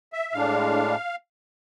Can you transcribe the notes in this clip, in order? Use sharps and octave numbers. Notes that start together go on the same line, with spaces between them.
E5
A2 G#3 D4 F5